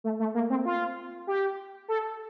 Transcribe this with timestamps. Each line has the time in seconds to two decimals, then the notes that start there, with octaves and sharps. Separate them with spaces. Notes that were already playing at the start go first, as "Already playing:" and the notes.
0.04 A3
0.19 A3
0.35 A#3
0.50 C4
0.65 F4
1.27 G4
1.88 A4